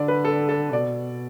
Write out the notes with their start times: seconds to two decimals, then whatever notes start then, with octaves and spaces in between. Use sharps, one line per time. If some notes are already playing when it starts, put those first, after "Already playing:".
Already playing: D3 D5
0.08 B4
0.25 A4
0.49 A4
0.73 B2 D5